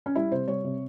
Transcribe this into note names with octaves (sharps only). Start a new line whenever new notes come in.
C#4
G3 E4
C3 C5
G3 C#5
C3